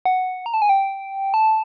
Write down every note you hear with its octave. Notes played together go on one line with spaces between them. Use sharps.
F#5
A#5
A5
G#5
G5
A5